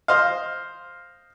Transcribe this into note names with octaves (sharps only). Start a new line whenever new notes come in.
C5 D#5 F5